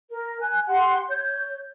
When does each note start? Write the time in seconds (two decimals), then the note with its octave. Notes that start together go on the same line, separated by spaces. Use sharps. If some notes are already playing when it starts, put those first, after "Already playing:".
0.10 A#4
0.41 G#5 F#6
0.68 G4 F#5 C6
1.09 C#5 G6